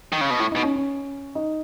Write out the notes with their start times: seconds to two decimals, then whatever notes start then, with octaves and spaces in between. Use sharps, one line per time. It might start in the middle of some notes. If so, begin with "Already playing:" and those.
0.12 D#3
0.21 C#3
0.30 B2
0.39 A2 E4
0.51 B2 D#4
0.63 C#4
0.76 C#4
1.35 D#4